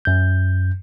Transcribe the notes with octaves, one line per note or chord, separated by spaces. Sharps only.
F#2 G6